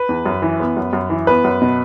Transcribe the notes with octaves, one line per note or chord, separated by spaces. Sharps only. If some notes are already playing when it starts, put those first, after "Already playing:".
Already playing: B4
E2
F#2
E3
B3
F#2
F#2
E3
B3 B4
F#2
B2